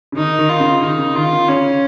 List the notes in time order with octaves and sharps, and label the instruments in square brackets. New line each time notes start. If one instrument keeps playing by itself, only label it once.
[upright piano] C#3
[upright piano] D#3 [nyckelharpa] D#4
[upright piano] D#3
[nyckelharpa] F4
[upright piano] C#3
[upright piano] D#3 [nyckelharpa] D#4
[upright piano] C#3
[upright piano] D#3 [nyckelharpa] F4
[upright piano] C#3
[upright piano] C#3 [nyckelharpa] C#4